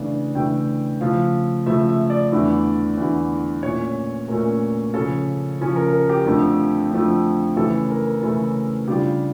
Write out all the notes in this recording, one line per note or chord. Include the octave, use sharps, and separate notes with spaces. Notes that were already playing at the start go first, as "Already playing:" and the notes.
Already playing: C#3 E3 A3 D4
C#3 E3 A3 D4 G5
C#3 F3 A3 F5
C#3 F3 A3 E5
E5
D5
E2 D3 A3 E4
E2 D3 A3 E4
A#2 A3 C#4 C#5
A#2 A3 C#4 A#4
C#3 F3 C#4 A4
C#3 F3 C#4
A#4
A#4
G4
F2 D3 F3 A3
F2 D3 F3 A3
C#3 E3 A3 C#4 E4 A4
A#4
C#3 E3 A3 C#4 E4 A4
C#3 G3 D4 F4 G4